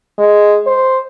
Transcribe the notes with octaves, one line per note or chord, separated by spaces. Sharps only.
G#3
C5